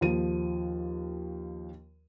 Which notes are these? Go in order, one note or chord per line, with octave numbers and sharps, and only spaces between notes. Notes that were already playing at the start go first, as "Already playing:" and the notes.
D#2 F3 D#7